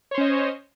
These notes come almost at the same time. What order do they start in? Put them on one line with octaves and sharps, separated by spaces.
C#5 C5 C#4 D#5